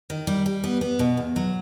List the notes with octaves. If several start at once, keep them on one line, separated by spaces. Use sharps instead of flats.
D#3
G3
G3
B3
B3
B2
E2
F#3